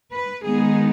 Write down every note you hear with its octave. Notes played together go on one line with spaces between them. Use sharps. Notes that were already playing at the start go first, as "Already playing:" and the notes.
B4
D#3 G#3 B3 D#4 G#4